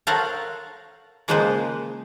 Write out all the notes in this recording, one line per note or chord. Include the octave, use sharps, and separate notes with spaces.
A4 A#4 C5 C#5 F5 F#5
C#3 F3 G#3 A#3 B4 C5